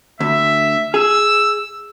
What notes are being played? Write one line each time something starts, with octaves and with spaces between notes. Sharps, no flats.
D2 E5
G#4 E6